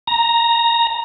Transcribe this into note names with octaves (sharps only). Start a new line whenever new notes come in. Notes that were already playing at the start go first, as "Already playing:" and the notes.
A#5